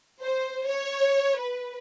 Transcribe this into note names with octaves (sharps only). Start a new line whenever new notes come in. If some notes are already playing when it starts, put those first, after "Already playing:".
C5
C#5
B4